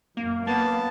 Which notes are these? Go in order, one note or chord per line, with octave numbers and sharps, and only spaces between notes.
F#2 A#3
A#3 B3 A5